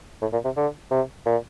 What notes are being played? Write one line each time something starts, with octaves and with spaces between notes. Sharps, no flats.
A2
A#2
C3
D3
C3
A#2